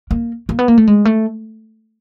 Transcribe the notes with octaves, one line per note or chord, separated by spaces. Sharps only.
A#3
A#3
B3
A#3
A3
G#3
A3